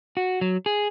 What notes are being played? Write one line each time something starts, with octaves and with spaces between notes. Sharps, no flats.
F#4
F#3
G#4